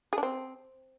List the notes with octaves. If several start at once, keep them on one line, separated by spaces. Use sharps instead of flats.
G#4
D4
C4